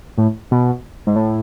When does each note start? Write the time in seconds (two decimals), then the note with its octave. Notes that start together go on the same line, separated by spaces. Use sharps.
0.18 A2
0.51 B2
1.07 G#2
1.16 A2